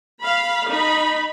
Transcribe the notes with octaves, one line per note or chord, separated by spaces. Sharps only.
F5 B5
D#4 B5